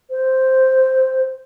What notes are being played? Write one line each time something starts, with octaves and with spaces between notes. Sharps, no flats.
C5